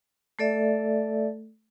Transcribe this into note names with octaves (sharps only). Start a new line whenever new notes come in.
A3 A4 D5 E5